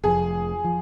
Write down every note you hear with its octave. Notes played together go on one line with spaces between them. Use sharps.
F1 F2 F3 G#4
F3